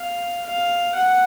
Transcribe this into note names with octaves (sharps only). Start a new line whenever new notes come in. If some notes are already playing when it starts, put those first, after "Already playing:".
Already playing: F5
F5
F#5